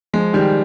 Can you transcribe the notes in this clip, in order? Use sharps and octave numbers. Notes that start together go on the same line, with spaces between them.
F3 G#3
D#3 G3